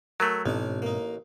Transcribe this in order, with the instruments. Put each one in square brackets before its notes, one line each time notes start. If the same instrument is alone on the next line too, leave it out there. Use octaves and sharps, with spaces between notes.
[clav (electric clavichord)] F#3 A3 [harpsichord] A#4 G#5
[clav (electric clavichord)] A1 [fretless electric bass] G#2 B2 C4 [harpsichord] D4 D#4
[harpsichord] A#3 D#4